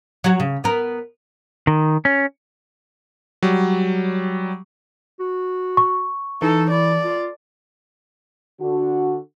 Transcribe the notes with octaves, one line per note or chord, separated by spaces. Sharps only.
F#3 F#4
C#3
B3 A#4
D#3
C#4
F#3 G3
F#4
C#6
E3 D#4 A4
E4 D5
F4
D3 F#4